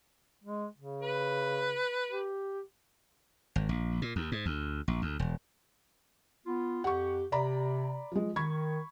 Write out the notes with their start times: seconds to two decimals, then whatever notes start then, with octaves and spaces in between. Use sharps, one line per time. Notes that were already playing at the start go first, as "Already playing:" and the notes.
0.44 G#3
0.78 C#3
1.02 B4
2.10 G4
3.56 G#1
3.69 A#1
4.02 A#2
4.16 D#2
4.32 G#2
4.46 D2
4.88 A#1
5.02 D2
5.19 E1
6.46 B3 F4
6.84 F2 G4 F#5 C#6
7.32 C3 D5 A#5 B5
8.12 F3 G#3
8.36 D#3 B5 C#6 G#6